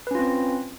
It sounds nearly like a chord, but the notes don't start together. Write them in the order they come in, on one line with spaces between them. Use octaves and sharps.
B4 C#4 F4 C4